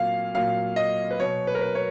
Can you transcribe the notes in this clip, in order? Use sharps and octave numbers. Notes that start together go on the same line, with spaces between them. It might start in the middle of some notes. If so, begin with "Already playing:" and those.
Already playing: A#2 F#3 F5
A#2 F#3 F5
D#5
B4
B2 F#3 C#5
B4
A#4
B4
C#5